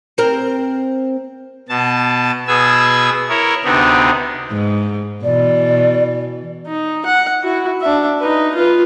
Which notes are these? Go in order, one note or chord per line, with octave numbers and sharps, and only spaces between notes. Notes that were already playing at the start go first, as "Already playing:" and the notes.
C4 A#4
B2 A5
B2 B3 G#4 G#5 E6
E4 A#4 C#5
D2 C3 B3 D4 D#4
G#2
B2 E3 D5
D#4
F#5
E4 F#4
D4 E5
D#4 B4
F4 B4